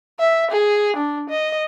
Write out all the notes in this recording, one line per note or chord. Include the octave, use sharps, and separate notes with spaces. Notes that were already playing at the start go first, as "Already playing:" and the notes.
E5
G#4
D4
D#5